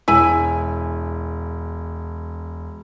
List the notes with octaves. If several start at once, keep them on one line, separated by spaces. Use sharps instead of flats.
E1 E4 G#5